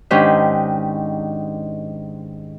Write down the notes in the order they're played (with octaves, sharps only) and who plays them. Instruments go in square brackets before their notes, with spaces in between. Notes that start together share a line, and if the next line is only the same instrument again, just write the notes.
[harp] G#2 D#3 C#4 D4 G4